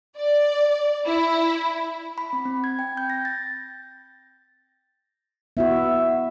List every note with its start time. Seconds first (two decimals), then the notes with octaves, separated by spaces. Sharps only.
0.16 D5
1.06 E4
2.18 B5
2.33 C4
2.46 C4
2.64 G#6
2.79 G5
2.97 G6
3.10 A#6
3.25 A6
5.57 B3 E4 F#4 E5